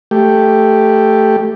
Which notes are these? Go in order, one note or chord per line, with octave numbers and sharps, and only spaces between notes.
A3 G4